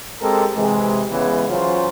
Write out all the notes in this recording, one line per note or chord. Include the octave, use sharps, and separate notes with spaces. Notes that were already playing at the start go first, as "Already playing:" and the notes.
G#3 C4 G4 A4 A#4
C3 E3 G#3
C#3 E3 G#3 B3
E3 F#3 C#4 F4 C5